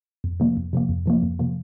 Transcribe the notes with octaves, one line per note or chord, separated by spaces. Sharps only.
F2
C3 F3 A#3
F2
C3 F3 A#3
F2
C3 F3 A#3
F2
C3 F3 A#3